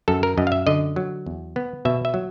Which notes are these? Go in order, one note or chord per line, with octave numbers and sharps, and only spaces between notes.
F#2 A4
A#4
F#2 D#5
F5
E5
D3 D#5
F#3
E2
B3
B2 E5
E5
F#3